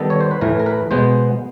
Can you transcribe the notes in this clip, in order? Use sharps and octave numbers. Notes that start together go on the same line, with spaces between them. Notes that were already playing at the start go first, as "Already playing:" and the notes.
Already playing: D#3 G3 B3 A4
C#5
C5
B4
A2 E3 A3 A#4
A#4
B4
B2 G#3 B3 C5